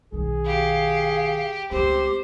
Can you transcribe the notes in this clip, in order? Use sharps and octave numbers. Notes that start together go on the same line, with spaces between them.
B1 D#3 G#4
G4 F5
C#2 A3 C4 G4 C5